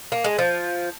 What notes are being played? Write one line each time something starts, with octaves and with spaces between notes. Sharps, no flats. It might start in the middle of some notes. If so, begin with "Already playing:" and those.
A#3
G#3
F3